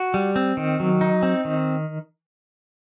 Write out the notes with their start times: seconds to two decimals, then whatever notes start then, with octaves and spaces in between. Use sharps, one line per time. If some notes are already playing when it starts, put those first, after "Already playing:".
Already playing: F#4
0.14 G3
0.36 C4
0.57 D#3
0.80 F#3
1.01 D#4
1.23 C4
1.45 D#3